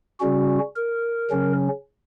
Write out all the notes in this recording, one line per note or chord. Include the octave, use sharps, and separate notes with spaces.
C#3 G3 C#4 F#4
A#4
C#3 F#3 C#4